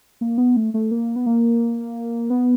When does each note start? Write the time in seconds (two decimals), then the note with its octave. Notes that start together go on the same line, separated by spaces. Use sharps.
0.21 A#3
0.38 B3
0.56 A3
0.74 A3
0.91 A#3
1.16 B3
1.26 A#3
2.30 B3